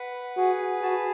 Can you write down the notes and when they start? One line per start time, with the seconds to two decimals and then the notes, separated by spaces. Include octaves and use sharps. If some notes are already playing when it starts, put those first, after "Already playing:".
Already playing: B4 F#5
0.37 F#4 G#4
0.82 F#4 A5